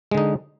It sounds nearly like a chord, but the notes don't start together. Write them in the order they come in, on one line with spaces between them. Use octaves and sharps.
G#3 D3 D#4